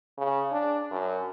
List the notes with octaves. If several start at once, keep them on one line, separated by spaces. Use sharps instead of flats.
C#3
D4
F#2